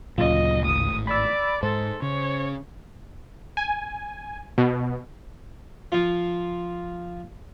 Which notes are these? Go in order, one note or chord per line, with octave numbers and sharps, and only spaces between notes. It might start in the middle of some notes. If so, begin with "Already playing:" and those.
D2 A#2 C#3 F#3 F4 D#5
G#1 A2 D#6
D5 B5 E6
G#2 A4 C5
C#3 C#5
G#5
B2
F3 F4